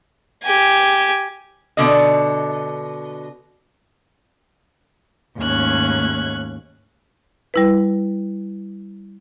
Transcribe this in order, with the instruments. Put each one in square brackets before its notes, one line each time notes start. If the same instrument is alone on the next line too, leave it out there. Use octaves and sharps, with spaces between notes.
[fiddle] G4 G#5
[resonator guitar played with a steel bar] B2 D3 D#5
[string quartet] D#2 G#2 A3 C#4 F#6 G#6
[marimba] G3 E4 B4